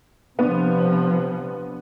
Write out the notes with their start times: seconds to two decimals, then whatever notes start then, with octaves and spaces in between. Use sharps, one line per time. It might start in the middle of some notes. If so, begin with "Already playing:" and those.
0.39 C3 F3 B3 D4